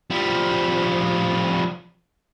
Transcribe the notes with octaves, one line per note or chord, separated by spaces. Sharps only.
F3 G3